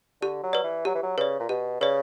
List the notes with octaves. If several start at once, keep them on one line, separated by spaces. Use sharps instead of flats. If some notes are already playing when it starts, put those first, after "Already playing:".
D3 G4
F#3
B4 D5
E3
F#3 G4
E3
F#3
C#3 B4 D5
A#2
B2 G4
C#3 B4 D5